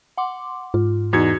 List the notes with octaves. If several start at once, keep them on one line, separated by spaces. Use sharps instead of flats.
F#5 C6 D6
G#2 F4
E2 D#4 F#4 G#6 C#7